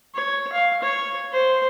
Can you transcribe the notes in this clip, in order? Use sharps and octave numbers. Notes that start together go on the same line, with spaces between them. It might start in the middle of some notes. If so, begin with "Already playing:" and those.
C#5
F5
C#5
C5